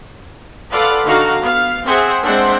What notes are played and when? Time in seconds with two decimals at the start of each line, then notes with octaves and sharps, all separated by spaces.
0.71 F4 A4 B4 D5 F5 F#5
1.06 D3 D#4 F#4 F5 A#5
1.41 B3 F5
1.86 C4 G#4 C5 E5 F#5
2.23 G#3 C4 D4 C5 E5 F#5